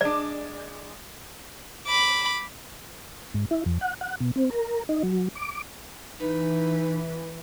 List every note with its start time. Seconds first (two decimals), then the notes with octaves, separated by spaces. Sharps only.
0.01 G#3 D4 D5
1.86 B5 D6
3.34 G#2
3.51 E4
3.66 F2
3.81 F#5
4.01 F#5
4.20 B2
4.36 C4
4.50 A#4
4.89 D#4
5.03 F#3
5.35 D6
6.19 E3 D#4 B4